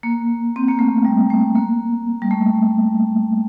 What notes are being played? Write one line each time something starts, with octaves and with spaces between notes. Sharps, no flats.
A#3
C4
A#3
A3
G3
A3
A#3
G3
A3